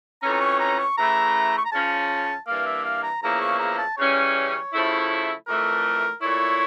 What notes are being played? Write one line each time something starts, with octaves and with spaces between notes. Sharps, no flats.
F2 E3 A3 C#4 A#5
A#5
C#6
A#5
C#6
C#3 E3 A3 E4 A#5
C#6
A#5
C#3 F3 C#4 A5
G2 E3 A#3 F5
E5
F5
A#5
E2 C#3 F3 A#3 E4 A#5
C#6
A#5
A5
C#3 E3 G3 C#4 C#5
C#3 F3 A3 E4
F2 E3 A3 A#4
A#2 A3 E4 C#5